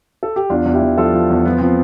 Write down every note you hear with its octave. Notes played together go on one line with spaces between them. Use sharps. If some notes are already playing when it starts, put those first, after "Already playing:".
A4
G4
E2 D4 F4
E2
E4 G4
E2
F3 F4 A4
F3
E2
F3 B3
F3 C4